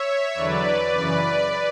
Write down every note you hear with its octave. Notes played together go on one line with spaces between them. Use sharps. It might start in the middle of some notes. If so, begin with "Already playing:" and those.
Already playing: C#5 E5
E2 D3 F#3 B4 D5
F#2 C#3 E3